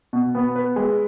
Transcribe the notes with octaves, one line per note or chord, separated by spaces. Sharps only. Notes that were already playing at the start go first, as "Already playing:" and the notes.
B2
B3
B4
G#3